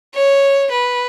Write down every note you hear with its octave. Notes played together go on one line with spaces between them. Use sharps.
C#5
B4